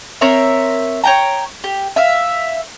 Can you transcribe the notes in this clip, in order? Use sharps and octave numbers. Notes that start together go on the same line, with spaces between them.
C4 A#4 C#5 E5
C#5 G5 A#5
G4
E5 F5